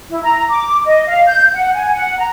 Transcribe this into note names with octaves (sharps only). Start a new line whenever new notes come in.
E4
A#5
D6
D#5
F5
G6
F#5
G#5
F#5
A#5